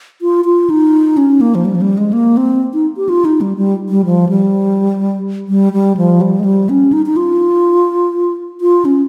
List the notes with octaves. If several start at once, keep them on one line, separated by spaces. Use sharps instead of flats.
F4
F4
D#4
C#4
A#3
F3
G3
F3
G3
G#3
A#3
C4
D#4
G4
F4
D#4
G3
G3
G3
F3
G3
G3
G3
F3
G3
G#3
G3
C#4
D#4
D#4
F4
F4
C#4